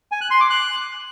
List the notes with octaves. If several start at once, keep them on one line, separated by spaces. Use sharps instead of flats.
G#5
F#6
C6
D6
F#6